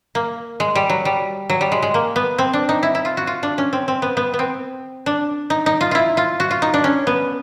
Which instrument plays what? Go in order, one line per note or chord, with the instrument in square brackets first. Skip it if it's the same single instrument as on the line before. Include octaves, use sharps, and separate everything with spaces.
[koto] A#3
G#3
G3
F#3
G3
F#3
G3
G#3
G#3
A#3
B3
C4
D4
D#4
E4
E4
F4
F#4
F4
D4
C#4
C4
C4
B3
B3
B3
C4
D4
D#4
D#4
F4
E4 F4
F4
F#4
F4
D#4
D4
C#4
B3